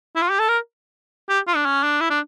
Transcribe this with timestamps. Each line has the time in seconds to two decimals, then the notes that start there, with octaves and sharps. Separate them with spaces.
0.16 E4
0.22 F4
0.30 G4
0.39 A4
0.49 A#4
1.29 G4
1.47 F4
1.56 D4
1.65 C#4
1.83 D4
2.01 E4
2.10 D4